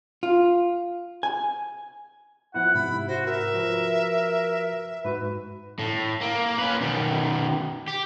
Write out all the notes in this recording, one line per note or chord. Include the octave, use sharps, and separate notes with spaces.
F4
G#5
F3 B3 E4 F#5
G#2 C3 E4 B5
F#4 C5
A#4 E5
F3 F#4 B4
G#2 F#4 B4
A2
A#3
C#4 B4
B2 D#3
G4